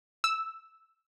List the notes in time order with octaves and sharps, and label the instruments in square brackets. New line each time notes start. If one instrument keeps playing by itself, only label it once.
[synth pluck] E6